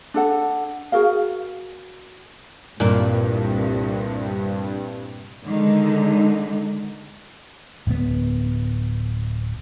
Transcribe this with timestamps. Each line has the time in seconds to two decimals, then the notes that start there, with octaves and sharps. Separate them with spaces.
0.14 D4 A4 F#5
0.92 F#4 G#4 A#4 F5
2.80 C2 G2 A#2 A#3
5.46 D3 D#3 G#3 D#4
7.87 D1 B3